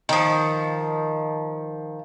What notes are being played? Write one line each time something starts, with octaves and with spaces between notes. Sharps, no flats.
D#3 F3